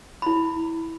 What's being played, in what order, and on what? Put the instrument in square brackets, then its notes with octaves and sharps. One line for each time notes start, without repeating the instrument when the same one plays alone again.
[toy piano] E4 B5